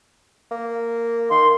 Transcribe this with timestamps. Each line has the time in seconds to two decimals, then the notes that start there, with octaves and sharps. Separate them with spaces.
0.51 A#3
1.31 D#3 C6